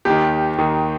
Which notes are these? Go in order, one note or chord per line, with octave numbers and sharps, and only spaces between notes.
D#2 D#3 G4
D#2 D#3